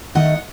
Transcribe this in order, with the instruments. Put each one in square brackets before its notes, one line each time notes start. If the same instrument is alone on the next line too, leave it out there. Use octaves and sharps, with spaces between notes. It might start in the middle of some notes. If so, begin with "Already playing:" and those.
[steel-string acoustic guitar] D#3 A3 D#4 D#5 F#5